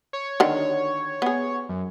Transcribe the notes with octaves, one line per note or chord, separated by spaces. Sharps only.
C#5
D3 D#3
B3 G#4
F#2